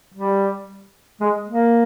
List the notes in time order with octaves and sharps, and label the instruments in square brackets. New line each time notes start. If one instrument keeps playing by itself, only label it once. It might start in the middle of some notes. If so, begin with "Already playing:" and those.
[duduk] G3
G#3
A#3